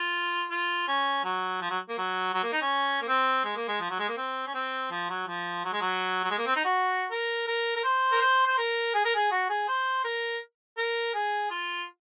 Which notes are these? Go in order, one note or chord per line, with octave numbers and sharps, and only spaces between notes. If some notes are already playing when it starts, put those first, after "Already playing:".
Already playing: F4
F4
C#4
F#3
F3
F#3
A#3
F#3
F#3
A#3
D#4
C#4
A#3
C4
G#3
A#3
G#3
F3
F#3
G#3
A#3
C4
C#4
C4
F3
F#3
F3
F#3
G#3
F#3
F#3
G#3
A#3
C4
D#4
F#4
A#4
A#4
A#4
C5
A#4
C5
C5
A#4
G#4
A#4
G#4
F#4
G#4
C5
A#4
A#4
G#4
F4